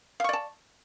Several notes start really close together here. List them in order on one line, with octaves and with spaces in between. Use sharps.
F5 C#6 D5 A5